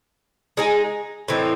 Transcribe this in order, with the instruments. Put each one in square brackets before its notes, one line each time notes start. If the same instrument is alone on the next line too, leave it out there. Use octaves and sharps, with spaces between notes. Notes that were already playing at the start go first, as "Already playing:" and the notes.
[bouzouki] G#3 D#4 G#4
A2 E3 C4 D#4